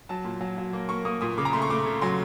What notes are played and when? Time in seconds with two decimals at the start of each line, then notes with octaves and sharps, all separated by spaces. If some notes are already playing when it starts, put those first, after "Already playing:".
0.09 F#3 A5
0.25 A#2
0.41 F#3
0.58 F#3
0.73 A#3
0.89 A#3 C#6
1.05 A#3 D#6
1.21 A#2 D#6
1.38 C#3 D6
1.45 A#5
1.53 A3 C6
1.62 C#6
1.70 A3 D6
1.86 C#3
2.01 F#3 C6